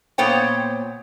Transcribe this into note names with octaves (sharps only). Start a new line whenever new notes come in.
A#2 B3 C5 C#5 G5